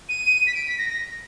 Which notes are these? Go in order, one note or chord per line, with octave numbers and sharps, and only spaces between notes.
D#7
B6
D7
B6
A#6
A#6